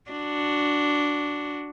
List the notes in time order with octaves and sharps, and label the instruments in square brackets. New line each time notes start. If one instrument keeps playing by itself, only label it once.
[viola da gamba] D4 F#4